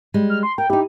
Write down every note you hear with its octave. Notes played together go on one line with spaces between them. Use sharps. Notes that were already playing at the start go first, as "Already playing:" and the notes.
G3 G#3
F6
C6
A#4 G5
D#4 E4 G4